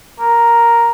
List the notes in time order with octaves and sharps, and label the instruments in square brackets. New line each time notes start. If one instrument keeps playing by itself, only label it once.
[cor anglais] A#4